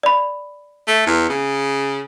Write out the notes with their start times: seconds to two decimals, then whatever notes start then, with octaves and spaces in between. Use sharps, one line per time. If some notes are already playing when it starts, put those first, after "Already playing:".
0.03 D5 B5
0.87 A3
1.06 E2
1.30 C#3